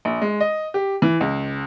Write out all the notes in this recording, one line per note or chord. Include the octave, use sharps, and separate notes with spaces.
A#1
G#3
D#5
G4
E3
C#2